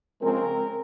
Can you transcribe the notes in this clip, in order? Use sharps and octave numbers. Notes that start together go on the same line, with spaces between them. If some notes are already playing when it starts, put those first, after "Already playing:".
C#3 F3 G#3 C4 A#4